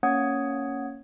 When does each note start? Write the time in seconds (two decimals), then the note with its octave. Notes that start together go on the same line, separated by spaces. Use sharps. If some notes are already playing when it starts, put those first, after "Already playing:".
0.03 A#3 C#4 C#5 F#5 D#6 G#6